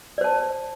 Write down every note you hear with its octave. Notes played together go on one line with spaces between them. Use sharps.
C5 D5 A5